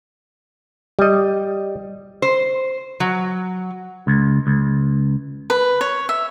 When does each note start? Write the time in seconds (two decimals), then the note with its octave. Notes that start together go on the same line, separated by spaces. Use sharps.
0.99 G3 D#5
2.22 C5
3.00 F#3
4.07 C#2
4.47 C#2
5.50 B4
5.81 C#5
6.09 E5